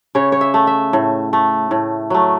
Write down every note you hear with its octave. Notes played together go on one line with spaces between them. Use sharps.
C#3 C#5
C#5
E5
A3
E5
A2
A3
A2
F#3 A3